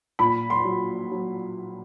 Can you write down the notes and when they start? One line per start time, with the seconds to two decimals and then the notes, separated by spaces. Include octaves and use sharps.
0.19 A#2 B5
0.50 C6
0.65 F#3
1.11 F#3